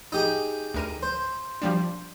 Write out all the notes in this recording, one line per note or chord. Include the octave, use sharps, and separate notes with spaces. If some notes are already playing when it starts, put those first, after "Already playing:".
D#4 G4 G#4 D#6
D2 A#4 D#7
C5
F3 G3 D4